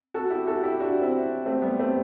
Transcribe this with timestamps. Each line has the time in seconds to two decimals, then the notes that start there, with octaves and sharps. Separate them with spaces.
0.14 F#4 A4
0.30 E4 G4
0.47 F#4 A4
0.63 E4 G4
0.80 D4 F#4
1.02 C4 E4
1.46 A3 C4
1.62 G3 B3
1.79 A3 C4